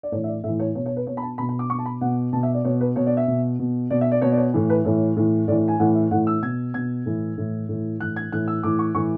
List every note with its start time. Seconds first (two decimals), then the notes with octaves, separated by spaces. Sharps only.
0.03 D5
0.12 A2 C#5
0.16 E3
0.24 E5
0.28 D5
0.44 A2 E5
0.48 E3
0.60 C#5
0.75 B2 C#5
0.86 C#5
0.96 B4
1.07 B2 C#5
1.17 B5
1.22 A5
1.38 B2 B5
1.49 B5
1.59 D6
1.70 B2 C#6
1.79 A5
1.86 B5
2.01 B2 F#5
2.33 B2 A5
2.43 E5
2.54 D5
2.65 B2 C#5
2.81 B4
2.96 B2 C#5
3.07 D5
3.17 E5
3.28 B2
3.59 B2
3.90 B2 D5
4.01 E5
4.12 D5
4.22 B2 C#5
4.32 D5
4.38 C#5
4.54 A2 E3
4.70 B4
4.85 A2 E3 C#5
5.17 A2 E3
5.48 A2 D5
5.52 E3
5.68 G#5
5.79 A2 E3 F#5
5.95 E5
6.11 A2 F#5
6.14 E3
6.27 E6
6.42 B2 G#6
6.74 B2 G#6
7.06 A2 E3
7.38 A2 E3
7.69 A2 E3
8.00 A2 E3 F#6
8.16 G#6
8.32 A2 E3 F#6
8.48 E6
8.63 A2 E3 D6
8.79 C#6
8.95 A2 E3 C#6